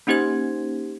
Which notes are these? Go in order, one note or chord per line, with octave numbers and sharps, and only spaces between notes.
A#3 C#4 D#4 G4 C5 G#6